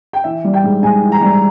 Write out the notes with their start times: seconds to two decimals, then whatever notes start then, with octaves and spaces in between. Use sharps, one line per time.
0.13 G5
0.24 E3 E5
0.44 G3
0.54 G5
0.64 G#2
0.83 G#2 G#5
1.03 E3
1.12 A#5
1.21 G3